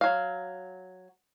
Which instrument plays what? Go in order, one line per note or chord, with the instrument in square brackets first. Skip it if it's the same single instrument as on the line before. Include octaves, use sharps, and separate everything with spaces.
[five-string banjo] F#3 F5